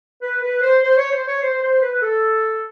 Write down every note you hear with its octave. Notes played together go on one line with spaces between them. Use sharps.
B4
B4
C5
C5
C#5
C5
C#5
C5
C5
B4
A4